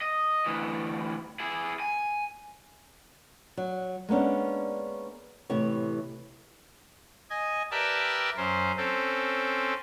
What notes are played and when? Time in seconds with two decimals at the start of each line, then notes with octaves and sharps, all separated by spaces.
0.01 D#5
0.46 D2 E3
1.40 E4 G#4
1.80 G#5
3.57 F#3
4.09 G#3 A#3 B3 C#4 D4
5.50 A2 C3 E3 G4 C#5
7.30 D#5 G#5
7.71 G4 A#4 B4 D5 E5 A5
8.37 F#2 C#4 C5
8.77 C4 C#4 A4